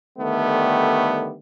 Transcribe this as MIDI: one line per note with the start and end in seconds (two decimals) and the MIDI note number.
0.19 1.36 50
0.19 1.36 51
0.19 1.36 55
0.19 1.36 57
0.19 1.36 59